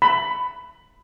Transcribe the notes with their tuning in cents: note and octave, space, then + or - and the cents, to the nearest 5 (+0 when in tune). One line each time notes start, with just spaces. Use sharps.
B5 +15